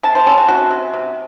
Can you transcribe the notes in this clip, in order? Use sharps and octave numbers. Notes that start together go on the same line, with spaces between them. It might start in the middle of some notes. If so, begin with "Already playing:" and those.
C3 A5
C5
C#4 A4
F#4
C3 F#4
C3
C3